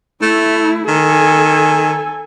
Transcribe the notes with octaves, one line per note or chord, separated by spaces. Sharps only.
A3 E4
D#3 A4 G#5